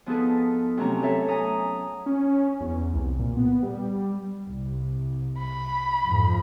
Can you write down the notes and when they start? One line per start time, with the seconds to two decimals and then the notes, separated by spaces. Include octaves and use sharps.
0.06 F3 B3 D#4 G#4 A4 B4
0.77 C3 F#3 A3 C#4 C#5 A#5
1.02 F#3 A4 C#5 E5
1.28 G#5 A#5 D#6
2.06 C#4
2.61 E2
2.93 C2
3.19 A#2
3.37 B3
3.63 G3
4.47 C2
5.39 B5
6.06 F2 G#2 F3